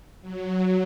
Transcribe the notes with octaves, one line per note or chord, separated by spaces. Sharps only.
F#3